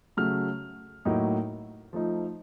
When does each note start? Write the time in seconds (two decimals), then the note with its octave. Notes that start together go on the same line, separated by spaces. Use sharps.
0.17 C#3 F#3 A3 F6
1.05 A2 F#3 A#3 D#4
1.93 F3 A3 D#4